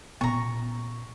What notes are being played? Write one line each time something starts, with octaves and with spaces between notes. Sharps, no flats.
A#2 B3 C#4 A#5 C#6